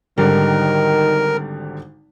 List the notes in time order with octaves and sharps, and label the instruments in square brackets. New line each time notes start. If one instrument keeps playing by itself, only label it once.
[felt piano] G#1 D3 G3 [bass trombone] D#3 [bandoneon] A#4